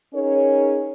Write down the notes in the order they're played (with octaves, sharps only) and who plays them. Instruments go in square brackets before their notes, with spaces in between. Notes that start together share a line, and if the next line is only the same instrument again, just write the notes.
[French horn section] C#4 D#4 G#4 A#4 C#5